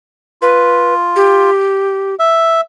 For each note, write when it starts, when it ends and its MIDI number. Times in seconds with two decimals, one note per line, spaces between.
0.42 1.51 65
0.42 0.94 71
1.16 2.15 67
2.19 2.61 76